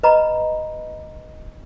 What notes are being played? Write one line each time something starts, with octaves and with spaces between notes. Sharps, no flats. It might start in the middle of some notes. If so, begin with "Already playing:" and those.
B4 D#5 A#5 B5